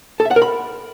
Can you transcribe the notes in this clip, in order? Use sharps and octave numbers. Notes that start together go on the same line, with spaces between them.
A4
E5
F#5
A#4
B5